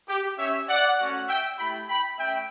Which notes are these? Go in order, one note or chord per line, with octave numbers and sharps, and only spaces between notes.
G4
C#4 G4 C#5 E5
D5 F#5
A3 C#4 F#4
E5 G5
A3 E4 G4 G5 B5
G5 B5
A3 C#4 E5 G5